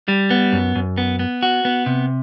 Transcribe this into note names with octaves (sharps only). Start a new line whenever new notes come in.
G3
B3
F#2
F#2
B3
B3
F#4
B3
C3